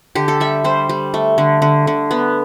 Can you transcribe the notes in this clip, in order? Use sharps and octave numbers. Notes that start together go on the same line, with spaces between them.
D3 G4
A4
G3 E5
G3 C5
G3
A3
D3
D3
D3
B3